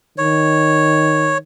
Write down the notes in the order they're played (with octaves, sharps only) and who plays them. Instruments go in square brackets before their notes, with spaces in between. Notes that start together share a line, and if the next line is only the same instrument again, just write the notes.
[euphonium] D#3 [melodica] C#5